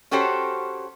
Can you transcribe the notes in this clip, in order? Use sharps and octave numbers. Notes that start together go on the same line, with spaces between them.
C#4 F#4 G4 A4 C5 C#5